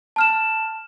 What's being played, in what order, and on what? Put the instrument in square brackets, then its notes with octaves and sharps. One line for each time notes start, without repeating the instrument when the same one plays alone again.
[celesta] A5 F6 E7